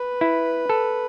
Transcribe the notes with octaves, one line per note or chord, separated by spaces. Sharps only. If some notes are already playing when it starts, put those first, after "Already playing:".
Already playing: B4
E4
A4